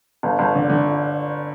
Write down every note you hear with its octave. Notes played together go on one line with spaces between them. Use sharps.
G1
G1
D3
D3